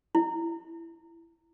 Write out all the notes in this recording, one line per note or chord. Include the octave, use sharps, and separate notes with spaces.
E4